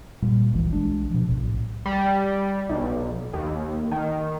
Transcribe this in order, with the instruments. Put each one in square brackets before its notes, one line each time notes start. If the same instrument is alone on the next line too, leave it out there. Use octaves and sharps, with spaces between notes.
[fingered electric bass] A#2 G3
F#1 C#2 E3
B1 G#3 D4
B2 F3
B1 A2
[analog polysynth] G3
B1
D#2
D#3